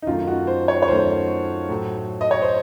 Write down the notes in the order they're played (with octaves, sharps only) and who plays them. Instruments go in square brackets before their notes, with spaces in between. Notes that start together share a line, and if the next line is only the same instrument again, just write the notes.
[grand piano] D#4
F#2 D#3 A3 F4
F#4
C5
C#5
C#5
F#2 D#3 A3 C5
A2 F#3 A3
D#5
C#5
C5